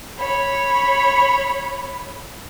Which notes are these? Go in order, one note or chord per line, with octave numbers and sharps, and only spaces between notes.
C#5 B5